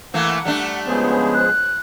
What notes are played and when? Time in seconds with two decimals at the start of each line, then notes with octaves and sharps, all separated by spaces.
0.14 E3 A3 A#3 F#5
0.45 G3 A3 D4
0.87 C#3 F3 G#3 B3 G#4 C5
1.34 F#6